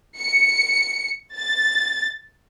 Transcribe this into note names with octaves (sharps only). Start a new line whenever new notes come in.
C#7
A6